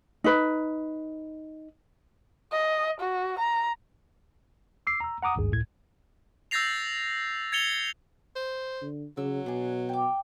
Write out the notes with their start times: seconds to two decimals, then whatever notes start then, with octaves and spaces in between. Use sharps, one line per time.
0.24 D#4 B4
2.52 D#5
3.01 F#4
3.39 A#5
4.87 D6 E6 C7
5.00 A#5 E6
5.22 F#5 A#5 D6 D#6
5.36 G#1 D2 G2 G#4
5.51 C#2 A2 G#6
6.51 E6 G6 A6 A#6 C7 F7
7.52 G#6 A6 C#7 F7 G7
8.36 C5
8.81 D3
9.17 C#3 F#3 E6
9.46 B2 D4 G#4
9.89 G5 D6